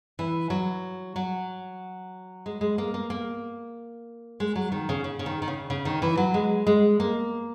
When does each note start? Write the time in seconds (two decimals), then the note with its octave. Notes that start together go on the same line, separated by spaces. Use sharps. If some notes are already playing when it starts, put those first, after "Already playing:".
0.19 E3
0.50 F#3
1.16 F#3
2.46 G#3
2.61 G#3
2.78 A#3
2.94 A#3
3.10 A#3
4.40 G#3
4.56 F#3
4.72 D#3
4.89 C#3
5.04 C#3
5.19 C#3
5.26 D#3
5.42 D#3
5.48 C#3
5.70 C#3
5.85 D#3
6.02 E3
6.17 F#3
6.34 G#3
6.67 G#3
7.00 A#3